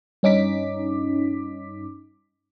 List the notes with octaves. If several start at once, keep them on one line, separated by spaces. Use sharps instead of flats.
G2 C#4 D#4 D6 B6